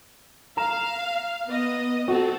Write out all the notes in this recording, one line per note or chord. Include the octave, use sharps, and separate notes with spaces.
F5 A#5 E7
B3 D#5
C4 F#4 A4